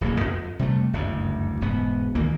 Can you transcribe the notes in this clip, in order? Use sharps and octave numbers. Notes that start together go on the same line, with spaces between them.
D1 B1 F#2 A#3
F2
C3 G3 A3
F#1 D2 G2
E1 G#2 B3
D2 D#3 E3 A#3